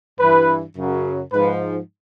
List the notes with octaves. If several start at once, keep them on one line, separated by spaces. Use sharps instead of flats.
G2 E3 B4
F#2 C#3 F#3
G#2 F3 B4